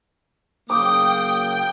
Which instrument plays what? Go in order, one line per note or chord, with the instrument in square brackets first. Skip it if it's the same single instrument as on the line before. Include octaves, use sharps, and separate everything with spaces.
[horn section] C#3 F#3 A#3 [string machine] G5 [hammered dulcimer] D6 [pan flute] D#6